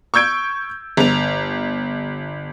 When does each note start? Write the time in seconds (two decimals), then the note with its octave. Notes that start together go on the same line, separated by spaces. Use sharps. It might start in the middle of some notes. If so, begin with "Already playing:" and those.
0.14 C#6 E6 G6 G#6 D7
0.97 G1 F7